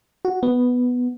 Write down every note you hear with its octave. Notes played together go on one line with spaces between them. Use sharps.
F#4
B3